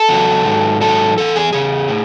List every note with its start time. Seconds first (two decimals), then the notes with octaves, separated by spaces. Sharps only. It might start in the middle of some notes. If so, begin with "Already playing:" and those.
Already playing: A4
0.09 E2 C#3 F#3
0.45 G#2 D#3 F#3
0.80 G#2 D#3 F#3 A4
1.17 E2 C#3 E3 A4
1.36 G#4
1.53 E2 C#3 G#4
1.89 A2